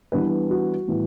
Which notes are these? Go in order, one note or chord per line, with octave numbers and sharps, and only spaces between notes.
E3 G3 B3 D4 B4
F#4
A2 E3 G3 B3